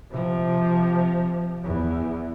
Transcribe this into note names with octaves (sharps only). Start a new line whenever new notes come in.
C3 F3
E2